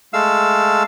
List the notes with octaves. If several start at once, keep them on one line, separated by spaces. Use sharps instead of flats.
G#3 A3 F5 E6